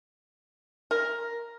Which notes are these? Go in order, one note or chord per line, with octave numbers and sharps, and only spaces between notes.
A#4